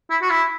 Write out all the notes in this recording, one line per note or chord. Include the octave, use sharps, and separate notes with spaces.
E4
F#4
E4